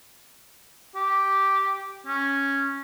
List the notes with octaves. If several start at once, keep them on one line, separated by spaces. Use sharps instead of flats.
G4
C#4